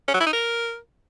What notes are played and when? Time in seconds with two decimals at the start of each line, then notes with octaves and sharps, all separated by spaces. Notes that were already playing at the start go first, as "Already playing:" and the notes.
0.08 C#4
0.14 F#3
0.20 E4
0.27 D#4
0.33 A#4